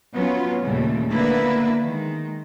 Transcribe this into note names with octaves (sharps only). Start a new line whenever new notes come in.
F#3 B3 C#4 F4
D#2 A#2 C#3 G3 A3
D3 A#3 B3 D4 E4 B4
D#3 G#3